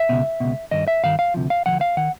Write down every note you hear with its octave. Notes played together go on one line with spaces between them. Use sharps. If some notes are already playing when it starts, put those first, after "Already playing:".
Already playing: E5
C#2 B2
C#2 B2
G2 D#3 D#5
E5
G2 D#3 F5
F5
D2 C3 F3
F5
D2 C3 F3 F#5
F5
D#3 F#5